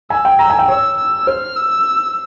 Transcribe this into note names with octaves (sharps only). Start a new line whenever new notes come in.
G#5 E6
G5
A#5 E6
G#5
G5
C#5 E6
E6
C5 F6
E6